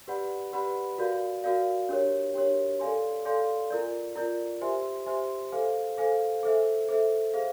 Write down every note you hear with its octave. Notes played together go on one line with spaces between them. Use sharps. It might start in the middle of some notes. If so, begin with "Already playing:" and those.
G4 B4 D5 F#5 B5
G4 B4 D5 F#5 B5
F#4 A#4 D5 F5
F#4 A#4 D5 F5
D4 G4 A#4 C#5
D4 G4 A#4 C#5
A4 D5 F5 G#5 C6
A4 D5 F5 G#5 C6
F4 A#4 D5
F4 A#4 D5
G4 C5 E5 G#5 C6
G4 C5 E5 G#5 C6
A4 C5 F5 G#5
A4 C5 F5 G#5
A4 C5 E5
A4 C5 E5
G#4 C5 F5